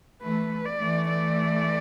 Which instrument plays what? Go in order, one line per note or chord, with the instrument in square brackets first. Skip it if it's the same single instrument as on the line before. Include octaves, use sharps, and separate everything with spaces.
[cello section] E3 A3 [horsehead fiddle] B4
[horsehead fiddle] D5
[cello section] E3 A3
[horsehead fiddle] D5